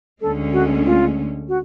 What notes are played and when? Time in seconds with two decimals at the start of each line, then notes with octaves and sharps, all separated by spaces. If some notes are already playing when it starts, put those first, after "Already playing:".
0.21 D2 D3 G#3 C#4 A4
0.53 F#4
0.86 F4
1.48 F#4